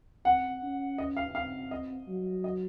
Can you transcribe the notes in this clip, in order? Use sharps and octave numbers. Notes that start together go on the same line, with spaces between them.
C4 F#5
C#4
D#5
F5
C4 F5
D#5
F#3
D#5